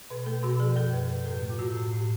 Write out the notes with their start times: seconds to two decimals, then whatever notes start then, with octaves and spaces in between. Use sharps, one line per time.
0.10 B2 B4
0.26 A3 A4
0.43 B2 F#4
0.60 F3 G#4
0.76 F#2 A4
0.93 F#2 B4
1.09 F#2 B4
1.26 A2 A4
1.42 A3
1.50 F4
1.59 A2 F#4
1.76 A2
1.93 A2